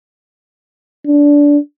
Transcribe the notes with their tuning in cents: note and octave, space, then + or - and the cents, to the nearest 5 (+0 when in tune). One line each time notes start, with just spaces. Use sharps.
D4 -20